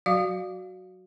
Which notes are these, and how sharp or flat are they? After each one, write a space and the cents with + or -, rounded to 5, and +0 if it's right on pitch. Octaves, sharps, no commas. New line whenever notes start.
F#3 +0 F#4 +0 F5 +0